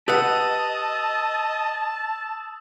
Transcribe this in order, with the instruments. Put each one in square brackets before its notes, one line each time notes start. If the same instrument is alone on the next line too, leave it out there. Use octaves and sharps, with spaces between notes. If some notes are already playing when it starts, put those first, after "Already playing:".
[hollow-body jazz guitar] G4 B4 F#5 [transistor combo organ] D#5 [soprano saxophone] A5 [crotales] D#6 E6